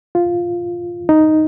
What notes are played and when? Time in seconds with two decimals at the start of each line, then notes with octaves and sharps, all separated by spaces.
0.15 F4
1.09 D#4